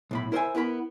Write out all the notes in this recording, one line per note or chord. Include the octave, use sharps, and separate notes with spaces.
B1 A2 B5
E4 A#4 C5 D#5 E5 G#5
B3 E4 A#4 B5